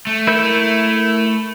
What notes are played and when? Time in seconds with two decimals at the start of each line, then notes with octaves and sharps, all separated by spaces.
0.07 A3
0.27 E4 A#4 G6